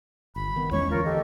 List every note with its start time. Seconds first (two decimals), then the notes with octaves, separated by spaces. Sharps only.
0.36 G1 B5
0.56 D#3 B3
0.71 E2 G#3 C#4 C#5 C#6
0.91 D2 E3 F4 A#4
1.05 G4 A4 D#5